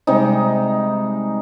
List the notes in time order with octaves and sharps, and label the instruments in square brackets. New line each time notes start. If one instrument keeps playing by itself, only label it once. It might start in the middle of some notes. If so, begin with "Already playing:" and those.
[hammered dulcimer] C3 G3 G#3 D#4